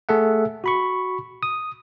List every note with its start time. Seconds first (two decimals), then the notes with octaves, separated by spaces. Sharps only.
0.09 A3 G#4 A4 E5 F#5
0.64 F#4 B5 C#6
1.43 D#6